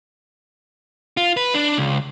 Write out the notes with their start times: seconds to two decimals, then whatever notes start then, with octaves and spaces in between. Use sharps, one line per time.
1.17 F4
1.37 B4
1.54 D4
1.78 C#2